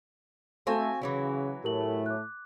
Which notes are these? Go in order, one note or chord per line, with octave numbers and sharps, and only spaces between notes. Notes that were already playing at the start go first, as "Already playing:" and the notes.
A3 C4 F#4 A4 E5 F5 G#5 C#6
C#3 E3 F#3 E4
A2 A3 G4 A#4 F#7
D6 F#6